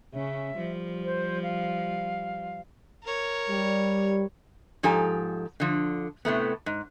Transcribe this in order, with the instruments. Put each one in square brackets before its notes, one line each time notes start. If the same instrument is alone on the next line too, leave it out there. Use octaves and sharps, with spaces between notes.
[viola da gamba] C#3 C#4 [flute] E5
[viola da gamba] F3 G3
[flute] C5
F5
[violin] A#4 C#5
[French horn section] G3
[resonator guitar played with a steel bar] G#2 F3 G4 A4 G#5 A#5
D3 F3
A2 C3 A3 B3
G#2